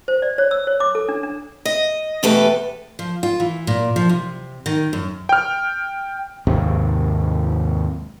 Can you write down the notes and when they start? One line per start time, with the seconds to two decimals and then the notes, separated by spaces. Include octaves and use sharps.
0.08 C5
0.22 D5
0.38 C#5
0.51 E6
0.67 C#5
0.80 D6
0.95 A4
1.09 D4
1.23 D4
1.65 D#5
2.23 E2 B2 A3 G4 A4 B4
2.99 F3
3.23 F4
3.40 E3
3.67 A#2
3.96 F3
4.09 C3
4.66 D#3
4.93 F#2
5.29 G5 F6
6.47 D#2 G#2 C3